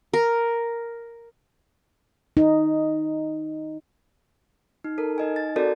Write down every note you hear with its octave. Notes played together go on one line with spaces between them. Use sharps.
A#4
D#4
D#4
A4 A#4
D#4 D#5 G#5
A6
C4 F#4 A4 A#4 D5